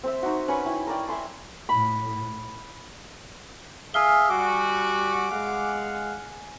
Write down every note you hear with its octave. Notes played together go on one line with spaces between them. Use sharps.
C4 C5 E5
D#4 F#4
C#4 B4 B5 C#6
E4 G5
A#4 D5 G5
E5 G#5 B5 C6
A2 B5
G#4 E5 F5 G#5 F6 G7
G3 F#4 D6
G#3 F5 F#5